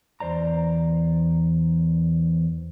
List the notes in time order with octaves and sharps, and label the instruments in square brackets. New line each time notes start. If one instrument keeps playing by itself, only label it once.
[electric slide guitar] E2 C5 D5 A#5